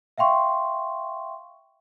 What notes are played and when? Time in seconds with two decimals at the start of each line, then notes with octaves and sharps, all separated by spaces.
0.18 E5 F5 G5 C6 C#6